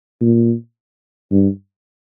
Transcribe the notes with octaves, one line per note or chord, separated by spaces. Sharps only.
A#2
G2